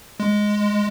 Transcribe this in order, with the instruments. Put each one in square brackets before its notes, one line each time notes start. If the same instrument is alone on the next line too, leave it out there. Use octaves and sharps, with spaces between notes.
[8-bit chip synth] G#3